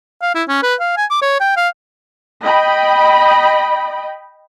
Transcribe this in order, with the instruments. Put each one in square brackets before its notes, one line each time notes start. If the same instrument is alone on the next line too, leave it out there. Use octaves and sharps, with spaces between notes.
[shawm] F5
E4
C#4
B4
F5
G#5
D6
C#5
G5
F5
[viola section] D#5 G5 B5